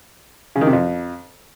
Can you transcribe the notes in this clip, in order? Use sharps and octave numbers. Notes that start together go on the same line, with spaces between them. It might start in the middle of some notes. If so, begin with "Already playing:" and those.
C#3
D#3
C3
F2